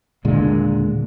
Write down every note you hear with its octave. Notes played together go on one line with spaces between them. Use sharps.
D#1 A#2 D3 G#3